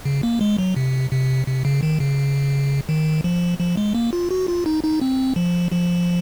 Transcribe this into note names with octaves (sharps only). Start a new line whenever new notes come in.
C#3
A#3
G#3
F#3
C3
C3
C3
C#3
D#3
C#3
D#3
F3
F3
G#3
A#3
F4
F#4
F4
D#4
D#4
C4
F3
F3